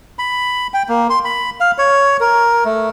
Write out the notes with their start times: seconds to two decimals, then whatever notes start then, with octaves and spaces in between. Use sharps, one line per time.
0.19 B5
0.74 G5
0.89 A#3
1.10 C6
1.25 B5
1.60 F5
1.78 C#5
2.20 A#4
2.65 A3